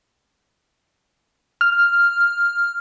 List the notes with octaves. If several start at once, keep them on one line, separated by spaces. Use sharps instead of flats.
F6